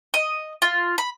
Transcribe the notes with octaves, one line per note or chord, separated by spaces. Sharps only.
D#5
F4
B5